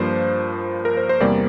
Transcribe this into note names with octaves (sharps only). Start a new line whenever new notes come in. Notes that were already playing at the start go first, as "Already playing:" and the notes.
Already playing: G2 F3 A#3 C5
A#4
C5
C5
E2 C3 G3 A#3 D5